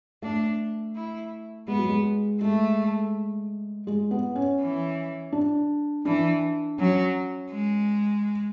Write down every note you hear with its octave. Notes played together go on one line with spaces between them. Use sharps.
A3 D4
E4
G#3 B3
F#3
G#3
G#3 A3
G#3
B3
C#4
E3
D4
E3 D4
F#3 C#4
G#3